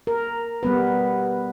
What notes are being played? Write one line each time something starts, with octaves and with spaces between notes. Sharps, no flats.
A#4
G3 B3 B4